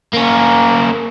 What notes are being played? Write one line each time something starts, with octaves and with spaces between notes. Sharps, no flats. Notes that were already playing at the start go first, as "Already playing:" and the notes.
A#3 C#4